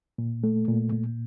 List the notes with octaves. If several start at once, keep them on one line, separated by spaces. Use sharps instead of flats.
A#2
A3
A#2
A#2